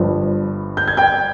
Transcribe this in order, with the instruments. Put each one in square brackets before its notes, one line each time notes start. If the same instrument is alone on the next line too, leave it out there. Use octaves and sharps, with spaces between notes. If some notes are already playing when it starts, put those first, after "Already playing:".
Already playing: [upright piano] G1 G2 F3
G6
G#6
G5 G6